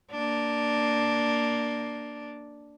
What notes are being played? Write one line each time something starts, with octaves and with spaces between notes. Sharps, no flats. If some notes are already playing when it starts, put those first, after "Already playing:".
A#3 D4